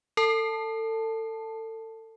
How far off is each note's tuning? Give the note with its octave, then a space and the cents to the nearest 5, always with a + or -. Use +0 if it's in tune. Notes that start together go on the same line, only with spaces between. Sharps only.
A4 +30 A5 +0